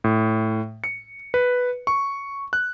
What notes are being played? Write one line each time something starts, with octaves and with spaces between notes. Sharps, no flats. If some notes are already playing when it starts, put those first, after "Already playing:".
A2
C#7
B4
C#6
F#6